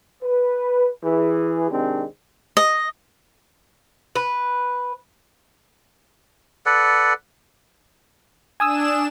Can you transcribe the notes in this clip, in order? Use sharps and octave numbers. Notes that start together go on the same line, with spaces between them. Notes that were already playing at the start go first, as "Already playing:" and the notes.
B4
E3 G#4
C3 D#3 G#3 C4 D4
D#5
B4
A4 B4 D5 F#5
D4 G#5 D#6 E6 E7